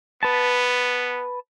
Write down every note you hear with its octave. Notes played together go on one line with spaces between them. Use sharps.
B3 B4 A5